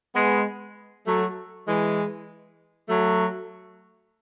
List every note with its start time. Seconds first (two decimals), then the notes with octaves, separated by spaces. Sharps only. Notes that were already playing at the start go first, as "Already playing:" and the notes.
0.15 G#3 B3
1.07 F#3 A3
1.67 E3 G#3
2.89 F#3 A3